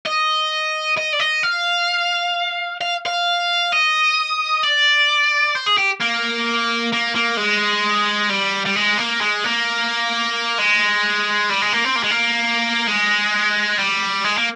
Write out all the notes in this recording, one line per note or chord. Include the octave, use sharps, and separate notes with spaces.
D#5
D#5
D5
D#5
F5
F5
F5
D#5
D5
C5
G#4
G4
A#3
A#3
A#3
G#3
G3
G3
G#3
A#3
G#3
A#3
G#3
G3
G#3
A#3
C4
A#3
G#3
A#3
G#3
G3
G#3
A#3